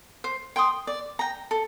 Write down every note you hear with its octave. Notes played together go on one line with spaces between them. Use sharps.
C5
G5 C6 D#6
D5
G5 A#5
A4